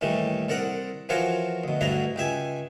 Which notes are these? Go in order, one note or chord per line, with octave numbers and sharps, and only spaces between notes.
D#2 A2 E3 G3 A3
C2 A4 A#4 D5 F#5 D#6
E3 F3 F4 F#4 A#4 C#5
D2 B2
D2 G2 F#3 D4 E4 A#5
C#2 G4 E5 G#5